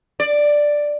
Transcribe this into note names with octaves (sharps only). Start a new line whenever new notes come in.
D5